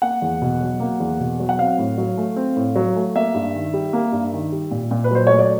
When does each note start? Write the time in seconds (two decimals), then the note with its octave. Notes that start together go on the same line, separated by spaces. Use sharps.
0.02 A#3 F#5
0.22 E2
0.42 B2
0.61 F#3
0.80 A#3
1.00 E2
1.20 B2
1.40 F#3
1.49 F#5
1.59 C4 F5
1.78 A2
1.98 F#3
2.18 A3
2.36 C4
2.56 A2
2.76 F#3
2.96 A3
3.16 A#3 E5
3.34 G2
3.55 D#3
3.74 G3
3.93 A#3
4.12 G2
4.33 D#3
4.52 G3
4.71 A#2
4.91 A#2
5.04 B4
5.11 F#3 C5
5.27 A3 C#5
5.39 D5